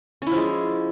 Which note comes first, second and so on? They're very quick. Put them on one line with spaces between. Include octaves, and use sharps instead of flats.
C#4 E4 F3 G#3